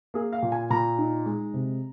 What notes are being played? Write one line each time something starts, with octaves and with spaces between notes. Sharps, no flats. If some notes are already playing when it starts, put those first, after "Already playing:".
A#3 G#4
F5
A#2
G#5
A#2 A#5
D#4
G#3
C3